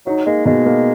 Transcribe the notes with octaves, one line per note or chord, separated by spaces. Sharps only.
F#3 D#4
G#3 A#3
B2 G#3
A#3